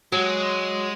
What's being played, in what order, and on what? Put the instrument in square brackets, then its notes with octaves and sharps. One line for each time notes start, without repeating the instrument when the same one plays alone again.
[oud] F#3 [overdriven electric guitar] G#3